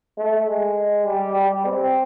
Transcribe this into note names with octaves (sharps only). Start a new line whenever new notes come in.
A3
G#3
G3
G3
C4